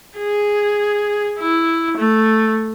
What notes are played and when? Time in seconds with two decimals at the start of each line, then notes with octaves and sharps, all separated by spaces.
0.19 G#4
1.39 E4
1.97 A3